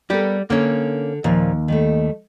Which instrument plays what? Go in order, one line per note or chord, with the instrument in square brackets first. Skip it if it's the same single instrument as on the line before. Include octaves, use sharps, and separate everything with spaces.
[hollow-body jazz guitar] G3 G4 [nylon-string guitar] B3 A4 A#4
[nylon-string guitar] D3 [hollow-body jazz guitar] A#3 C#4
[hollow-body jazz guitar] D#2 [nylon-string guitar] A#2 F3
[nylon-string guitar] D#3 G3 A3